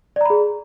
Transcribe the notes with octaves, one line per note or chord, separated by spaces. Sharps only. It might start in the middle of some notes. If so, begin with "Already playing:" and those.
G#4 D5 A#5 B5